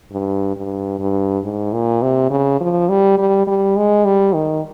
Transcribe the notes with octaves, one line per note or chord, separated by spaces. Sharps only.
G2
G2
G2
G#2
A#2
C3
C#3
F3
G3
G3
G3
G#3
G3
D#3